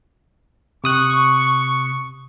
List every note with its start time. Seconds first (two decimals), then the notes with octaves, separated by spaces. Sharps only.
0.84 C3 C#6 D#6 F#6